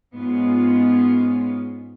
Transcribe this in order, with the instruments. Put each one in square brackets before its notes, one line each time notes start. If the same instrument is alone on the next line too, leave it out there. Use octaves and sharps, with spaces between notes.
[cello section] G#2 G#3 B3 C#4 F4